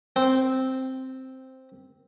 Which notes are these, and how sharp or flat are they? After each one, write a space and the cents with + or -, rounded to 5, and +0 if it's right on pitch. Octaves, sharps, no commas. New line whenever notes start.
C4 +0 G5 -15